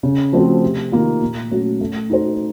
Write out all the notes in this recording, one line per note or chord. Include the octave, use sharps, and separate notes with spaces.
C#3
F3 A3 C4 F#4
C3
D#3 A#3 F4
A#2
F#3 A3 C#4 F#4
A3
D#4 F#4 A4 C5